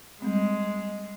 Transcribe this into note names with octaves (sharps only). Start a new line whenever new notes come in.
G3 G#3 C4